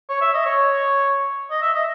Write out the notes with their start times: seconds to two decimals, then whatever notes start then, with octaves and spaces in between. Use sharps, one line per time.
0.09 C#5
0.21 E5
0.34 D#5
0.45 C#5
1.51 D#5
1.62 E5
1.74 D#5